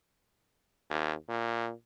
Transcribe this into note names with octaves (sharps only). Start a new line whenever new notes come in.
D#2
A#2